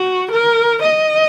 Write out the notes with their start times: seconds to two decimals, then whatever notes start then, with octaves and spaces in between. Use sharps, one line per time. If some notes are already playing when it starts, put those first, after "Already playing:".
Already playing: F#4
0.31 A#4
0.81 D#5